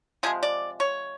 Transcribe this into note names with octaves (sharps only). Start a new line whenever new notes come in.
C3 F3 G#3 G#4
D5
C#5